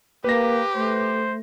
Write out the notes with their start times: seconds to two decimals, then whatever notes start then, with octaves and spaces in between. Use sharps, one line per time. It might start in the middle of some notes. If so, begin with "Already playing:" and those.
0.24 A#3 G4 B4 A#6
0.75 A3 C5